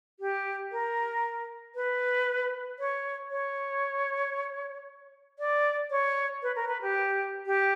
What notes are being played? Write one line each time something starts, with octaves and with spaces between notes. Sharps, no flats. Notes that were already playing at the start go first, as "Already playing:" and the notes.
G4
A#4
B4
C#5
C#5
D5
C#5
B4
A#4
B4
G4
G4